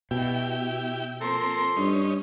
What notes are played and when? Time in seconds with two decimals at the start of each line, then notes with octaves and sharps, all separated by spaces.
0.11 B2 E4 G4 G5
1.21 F3 A#3 C4 A4 A#4 C6
1.76 G2 C#4 D#4